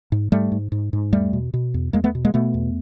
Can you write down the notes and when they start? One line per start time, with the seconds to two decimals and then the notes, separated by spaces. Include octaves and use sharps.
0.12 G#2
0.32 G#2 G3 A3
0.52 G#2
0.72 G#2
0.93 G#2
1.12 E2 G3 A3
1.33 B2
1.54 B2
1.74 E2
1.93 E2 G#3 A#3
2.04 A3 B3
2.15 B2
2.25 G#3 A#3
2.34 B2 A3 B3
2.54 E2